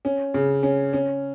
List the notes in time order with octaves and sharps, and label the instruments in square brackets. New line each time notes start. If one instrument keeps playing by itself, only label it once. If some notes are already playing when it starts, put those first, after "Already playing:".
[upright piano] C#4
C#3
C#4
C#4